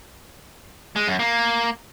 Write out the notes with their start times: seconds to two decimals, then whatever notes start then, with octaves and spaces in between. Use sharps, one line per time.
0.96 G#3
1.07 F#2
1.19 A#3